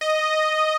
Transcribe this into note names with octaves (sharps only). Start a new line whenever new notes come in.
D#5